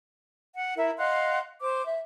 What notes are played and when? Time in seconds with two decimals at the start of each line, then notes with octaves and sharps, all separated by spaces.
0.55 F#5
0.77 E4 A#4 E5
0.98 D#5 F5 F#5 C6
1.61 C5 D6
1.85 E5